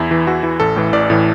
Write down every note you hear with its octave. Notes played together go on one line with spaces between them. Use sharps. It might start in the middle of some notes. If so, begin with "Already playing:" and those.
Already playing: E2 E4
E3
E2 F#4
E3
A1 A4
A2 E3
A1 D5
A2 E3